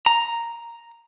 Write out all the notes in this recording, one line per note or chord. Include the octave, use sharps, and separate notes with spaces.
A#5